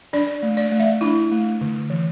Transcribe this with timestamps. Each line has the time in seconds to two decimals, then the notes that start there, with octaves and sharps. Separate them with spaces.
0.13 D4 D5
0.43 A3
0.57 D5
0.72 A3
0.79 E5
1.01 D4 E4
1.31 A3
1.61 D3
1.90 E3